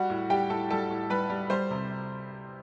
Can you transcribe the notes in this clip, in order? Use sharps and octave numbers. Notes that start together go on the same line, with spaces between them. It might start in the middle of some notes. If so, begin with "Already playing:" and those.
Already playing: G3 F#4 F#5
A2
G3 G4 G5
A2 A4 A5
G3 A4 A5
A2
G3 B4 B5
G3
G3 C5 C6
C3